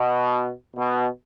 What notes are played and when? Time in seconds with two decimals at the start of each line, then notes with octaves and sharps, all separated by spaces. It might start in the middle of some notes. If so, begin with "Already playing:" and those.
Already playing: B2
0.75 B2